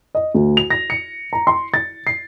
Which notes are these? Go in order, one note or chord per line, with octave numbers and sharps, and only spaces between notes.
D#5
D2
F7
A#6
C#7
A#5
C6
A6
C7